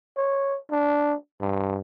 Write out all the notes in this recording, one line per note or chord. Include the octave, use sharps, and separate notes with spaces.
C#5
D4
G2